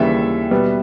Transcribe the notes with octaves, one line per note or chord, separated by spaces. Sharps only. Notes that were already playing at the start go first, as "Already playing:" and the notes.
Already playing: D#2 C#3 E3 G3 E5
B2 G3 B3